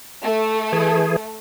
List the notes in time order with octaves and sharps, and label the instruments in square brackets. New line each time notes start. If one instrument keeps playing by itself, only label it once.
[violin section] A3
[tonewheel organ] E3 G#4